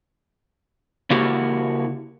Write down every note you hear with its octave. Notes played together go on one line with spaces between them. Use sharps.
C#3 A#3 E4 F#4 G4 A#4